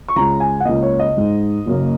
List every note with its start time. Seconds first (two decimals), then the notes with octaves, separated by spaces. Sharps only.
0.08 C#6
0.16 C#2 C#3 G#3 A#5
0.40 G#5
0.60 F#5
0.65 C#2 C#3 A#3 D#5
0.83 C#5
0.99 D#5
1.17 G#2 G#3 D#4
1.66 F#1 F#2 C#3 A#3